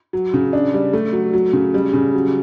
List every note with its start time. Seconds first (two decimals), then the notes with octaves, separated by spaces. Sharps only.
0.13 F#3
0.33 C#3
0.53 D4
0.74 G3
0.93 A3
1.13 F#3
1.33 F#3
1.53 C#3
1.74 G3
1.93 C#3
2.14 F#3